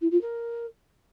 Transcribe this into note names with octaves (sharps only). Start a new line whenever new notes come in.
E4
F4
A#4